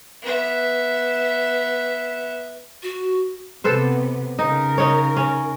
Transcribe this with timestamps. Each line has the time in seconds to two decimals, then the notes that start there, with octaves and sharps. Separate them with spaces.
0.22 B3 E5
2.83 F#4
3.64 C3 B3 A4 B4 C5
4.39 C#3 D#4 A#4
4.78 D#4 C#5
5.17 C#4